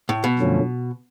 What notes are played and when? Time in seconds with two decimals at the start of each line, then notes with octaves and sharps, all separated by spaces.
0.09 A2
0.24 B2
0.39 F#2 D3 F3 A3 C#4